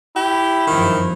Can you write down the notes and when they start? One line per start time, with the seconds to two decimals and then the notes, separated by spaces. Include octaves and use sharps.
0.16 E4 G4
0.67 G1 F#2 D#3 F3